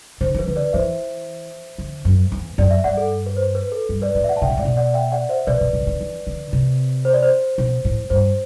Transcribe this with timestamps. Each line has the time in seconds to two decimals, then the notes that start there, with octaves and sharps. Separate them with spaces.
0.21 D3 C5
0.34 E3
0.39 B4
0.48 D3
0.56 B4 D5
0.73 E3 C5 E5
1.78 D3
2.05 F#2
2.32 E2
2.58 F#2 D5
2.71 E5
2.84 G2 D5 F#5
2.97 A4
3.26 B4
3.37 C5
3.55 B4
3.72 A4
3.89 G2
4.02 B4 D5
4.15 A2 B4 D5
4.24 E5
4.28 D5 F#5
4.37 A5
4.42 C3 E5 G5
4.50 B2
4.57 A2 D5 F#5
4.65 B2
4.77 D5 F#5
4.94 E5 G5
5.12 D5 F#5
5.29 C5 E5
5.47 B2 B4 D5
5.61 B2
5.73 B2
5.81 C3
5.87 D3
6.00 E3
6.27 D3
6.53 C3
7.05 C5
7.14 D5
7.23 C5
7.58 B2
7.85 A2
8.10 G2 C5